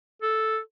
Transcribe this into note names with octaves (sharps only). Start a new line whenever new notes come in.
A4